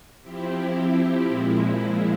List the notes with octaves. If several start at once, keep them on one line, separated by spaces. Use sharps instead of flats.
F3 C4 E4 G4
A#2 F3 G#3 E4